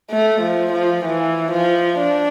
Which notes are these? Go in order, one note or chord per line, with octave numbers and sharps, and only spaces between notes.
A3
F3
F3
E3
F3
D4